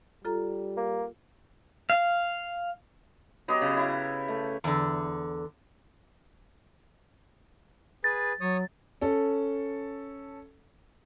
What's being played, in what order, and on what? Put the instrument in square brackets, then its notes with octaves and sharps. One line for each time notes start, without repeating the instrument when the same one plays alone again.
[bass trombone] G3 [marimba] F4 A4 A#5
[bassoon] A#3
[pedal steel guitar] F5
[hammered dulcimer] F#3 B3 G4 D#5
C#3
E4
A3
[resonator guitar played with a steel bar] E2 D3
[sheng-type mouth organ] G#4 B4 [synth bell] A6
[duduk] F#3 [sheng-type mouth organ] C#5 D#6
[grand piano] C#4 A4